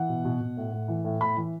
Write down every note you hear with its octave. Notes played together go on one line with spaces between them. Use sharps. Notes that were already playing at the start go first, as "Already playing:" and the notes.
Already playing: E3 F#5
B2
B2
B2
A2
A2
E3
A2
A2 B5
E3